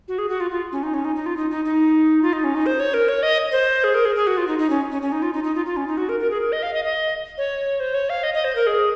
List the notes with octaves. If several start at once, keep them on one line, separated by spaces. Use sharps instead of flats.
F#4
G#4
F#4
F4
F4
C#4
D#4
C#4
D#4
D#4
F4
D#4
D#4
D#4
F4
D#4
C#4
D#4
C5
C#5
A#4
C#5
D#5
C5
G#4
A#4
G#4
G#4
F#4
F4
D#4
D#4
C#4
C#4
C#4
D#4
F4
D#4
D#4
F4
F4
C#4
D#4
F#4
A#4
A#4
G#4
A#4
D#5
F5
D#5
D#5
C#5
C5
C#5
F5
D#5
D#5
C5
A#4
G#4